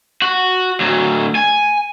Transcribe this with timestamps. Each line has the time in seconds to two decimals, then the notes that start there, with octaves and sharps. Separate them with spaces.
0.22 F#4
0.80 D2 F#3
1.35 G#5